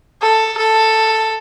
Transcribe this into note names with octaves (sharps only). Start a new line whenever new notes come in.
A4
A4